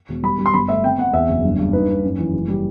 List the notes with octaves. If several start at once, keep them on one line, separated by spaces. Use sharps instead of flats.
E1
G3 B5
G3
C6
G1 B5
A3 E5
C4 G5
C4 F#5
E2 E5
F#1
G2
G2
D#4 B4
D#4
F#2
E3
F#1
G3